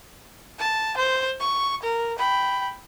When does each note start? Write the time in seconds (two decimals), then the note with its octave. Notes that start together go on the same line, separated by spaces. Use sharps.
0.59 A5
0.97 C5
1.40 C#6
1.82 A#4
2.18 G5 B5